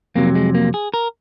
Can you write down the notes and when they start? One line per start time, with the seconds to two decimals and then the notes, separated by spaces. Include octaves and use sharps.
0.15 F2 C3 F#3 A#3
0.35 G#3
0.55 A#3
0.74 G#4
0.94 A#4